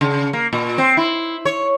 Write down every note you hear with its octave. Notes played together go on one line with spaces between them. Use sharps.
C#3
A#3
A#2
C4
E4
C#5